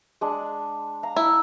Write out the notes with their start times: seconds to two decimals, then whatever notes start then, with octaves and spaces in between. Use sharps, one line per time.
0.21 G#3 D4
1.03 F5 A#5
1.16 E4